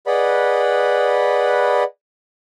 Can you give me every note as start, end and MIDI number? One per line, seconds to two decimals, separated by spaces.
0.07 1.84 68
0.07 1.84 71
0.07 1.84 74
0.07 1.84 75
0.07 1.84 78
0.07 1.84 83